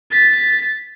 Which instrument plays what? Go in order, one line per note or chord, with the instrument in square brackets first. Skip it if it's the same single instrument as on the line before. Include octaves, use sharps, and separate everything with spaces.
[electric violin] A6 B6